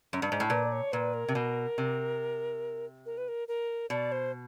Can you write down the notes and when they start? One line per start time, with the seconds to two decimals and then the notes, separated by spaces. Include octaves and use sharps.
0.13 F#2
0.22 G2
0.32 G#2
0.40 A2
0.50 A#2 B4
0.65 D5
0.72 C#5
0.92 A#2 B4
1.14 A#4
1.28 C3
1.35 B2
1.78 C3
3.06 A#4
3.17 B4
3.28 A#4
3.48 A#4
3.90 B2 D5
4.12 C5